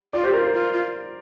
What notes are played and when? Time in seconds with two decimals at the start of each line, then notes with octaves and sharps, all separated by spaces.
0.13 F4 D5
0.23 G4 C5
0.33 F4 A#4
0.43 C5
0.53 F4
0.73 F4